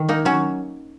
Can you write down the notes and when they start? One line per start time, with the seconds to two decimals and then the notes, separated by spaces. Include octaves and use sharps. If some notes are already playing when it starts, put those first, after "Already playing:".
Already playing: D#3
0.09 A#3 D#4
0.25 F#3 C#4